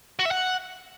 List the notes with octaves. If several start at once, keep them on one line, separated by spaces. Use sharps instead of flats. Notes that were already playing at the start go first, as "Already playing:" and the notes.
F#4
E5
F#5